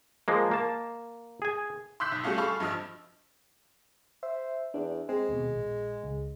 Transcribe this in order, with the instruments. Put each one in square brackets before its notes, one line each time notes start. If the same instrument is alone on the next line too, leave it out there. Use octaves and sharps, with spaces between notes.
[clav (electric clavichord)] F3 G#3 A#3
A#3 A5
G#4 G#5
[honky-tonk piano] C6 D6 E6 F#6 G6 B6
B1 D#6
G3 A3 C#4 F4 F#4
G#4 A4 F5 B5 C#6 F6
G2 F3 D#5 E6 F6
[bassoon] C5 [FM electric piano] E5
[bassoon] E2 [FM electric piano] D4
[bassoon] G#3 [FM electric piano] C4
[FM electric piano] D#2 B2
A#1
C#2